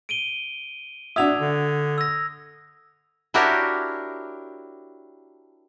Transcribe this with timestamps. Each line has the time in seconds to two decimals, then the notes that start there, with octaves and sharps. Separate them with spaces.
0.09 D7 D#7 G7
1.16 D4 F#4 E5 D#6 G#6 F7
1.39 D3
1.98 E6 A#6
3.34 D4 E4 F#4 G4 A#4 C#5